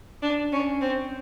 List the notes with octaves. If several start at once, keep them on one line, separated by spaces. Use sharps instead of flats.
D4
C#4
C4